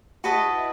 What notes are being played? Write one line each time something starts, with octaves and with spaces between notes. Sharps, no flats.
E4 F#4 B4 D#5 A5